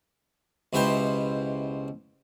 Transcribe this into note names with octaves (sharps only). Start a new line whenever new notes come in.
C#2 B2 E4 G4 C5